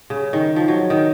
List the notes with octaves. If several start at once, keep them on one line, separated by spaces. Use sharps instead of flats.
C#3
D#3
F3
F#3
D#3